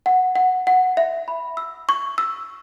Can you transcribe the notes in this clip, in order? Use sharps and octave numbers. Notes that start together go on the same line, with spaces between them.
F#5
F#5
F#5
E5
B5
E6
C#6
E6